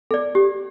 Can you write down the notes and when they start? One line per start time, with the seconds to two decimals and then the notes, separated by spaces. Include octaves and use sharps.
0.11 A4 D5
0.35 G4